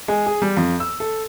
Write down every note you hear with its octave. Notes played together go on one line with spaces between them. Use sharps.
G#3
G#4
G3
F2
E6
A4